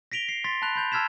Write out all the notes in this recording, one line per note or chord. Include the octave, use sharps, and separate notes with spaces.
A#6 B6 D7 F7 G7
C7
C6 A6 B6
A5 B5 F#6 F7
B5 G6 F7
A5 E6 F6 G#6 B6 E7